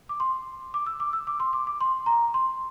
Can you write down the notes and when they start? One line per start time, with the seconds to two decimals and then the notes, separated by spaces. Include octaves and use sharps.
0.09 D6
0.20 C6
0.74 D6
0.86 E6
1.00 D6
1.13 E6
1.27 D6
1.40 C6
1.53 D6
1.67 D6
1.81 C6
2.06 A#5
2.34 C6